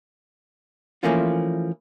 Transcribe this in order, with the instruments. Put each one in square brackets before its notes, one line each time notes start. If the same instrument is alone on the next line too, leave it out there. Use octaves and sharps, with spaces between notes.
[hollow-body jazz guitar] E3 F3 A3 A#3 C#4 F4